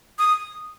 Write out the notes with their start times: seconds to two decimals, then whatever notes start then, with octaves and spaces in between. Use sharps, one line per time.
0.19 D#6